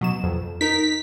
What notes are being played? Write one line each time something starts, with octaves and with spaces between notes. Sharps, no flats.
B2 F#3 E7
F2
D#4 A#4 B6